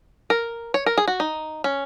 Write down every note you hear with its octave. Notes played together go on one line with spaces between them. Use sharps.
A#4
C#5
A#4
G#4
F#4
D#4
C#4